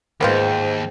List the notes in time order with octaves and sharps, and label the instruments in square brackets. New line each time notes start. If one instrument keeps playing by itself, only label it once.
[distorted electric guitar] D#2 [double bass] G#2 [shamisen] A#3 B3 F4 [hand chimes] C5 G5 G6